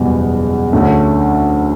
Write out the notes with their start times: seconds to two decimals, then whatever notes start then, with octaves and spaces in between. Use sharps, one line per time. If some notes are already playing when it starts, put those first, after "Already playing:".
Already playing: F#1 E2 B2 G3
0.73 D2 D3 A3 C#4